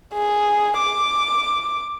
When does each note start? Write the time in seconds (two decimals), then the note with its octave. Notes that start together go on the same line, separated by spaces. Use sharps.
0.14 G#4
0.78 D6